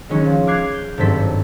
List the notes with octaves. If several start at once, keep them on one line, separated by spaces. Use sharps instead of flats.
D#3 F#3 G#3 C#4 D#4 F#4
F3
D6 F6 F#6 G#6 C7
G6
G#1 G2 F#3 C4 A4 B6